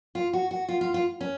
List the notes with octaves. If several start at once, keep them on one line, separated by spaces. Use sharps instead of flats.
F4
F#4
F#4
F4
F4
F4
C#4